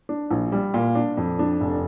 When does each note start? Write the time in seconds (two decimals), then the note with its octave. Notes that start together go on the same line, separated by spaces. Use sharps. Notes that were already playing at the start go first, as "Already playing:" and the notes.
0.09 D4
0.31 A#1
0.52 G3
0.74 A#2
0.95 D4
1.17 F2
1.39 D4
1.61 F1